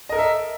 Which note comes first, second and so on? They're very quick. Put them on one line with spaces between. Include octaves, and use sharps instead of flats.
D#5 A#4 A4 E5